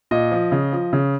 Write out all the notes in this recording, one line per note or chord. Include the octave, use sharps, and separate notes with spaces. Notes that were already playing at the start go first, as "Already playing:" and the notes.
A#2 D#5
F3
C#3
F3
C#3